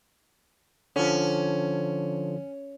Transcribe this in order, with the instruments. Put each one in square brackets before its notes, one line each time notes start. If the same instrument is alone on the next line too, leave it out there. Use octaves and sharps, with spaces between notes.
[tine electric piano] D3 F3 [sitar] C#4